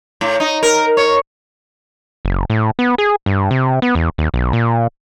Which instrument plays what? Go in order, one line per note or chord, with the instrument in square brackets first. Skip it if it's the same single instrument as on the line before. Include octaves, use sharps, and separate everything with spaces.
[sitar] A2
D#4
A#4
C#5
[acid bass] F#1
A2
B3
G#4
G2
C3
B3
E2
D#2
B1
A#2